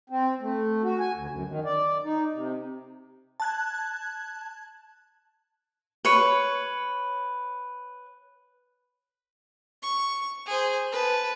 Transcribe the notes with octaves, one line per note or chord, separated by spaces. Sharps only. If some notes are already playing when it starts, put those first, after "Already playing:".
C4
A3
F#4
G#5
D2
F#2
D#3
D5
D#4
C3
A5 F#6 G#6
B4 C#5
C#6
G#4 C5
B4 A5